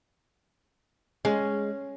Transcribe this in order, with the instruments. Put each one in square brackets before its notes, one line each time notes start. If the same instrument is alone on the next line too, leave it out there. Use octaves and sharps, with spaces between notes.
[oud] G#3 [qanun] C#4